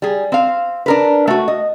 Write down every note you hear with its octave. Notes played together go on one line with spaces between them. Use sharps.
G3 G#4
C4 F5
D4 A#4 B4
A3 F#4
D#5